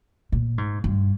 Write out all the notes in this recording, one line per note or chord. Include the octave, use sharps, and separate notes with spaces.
A#2
G#2
G2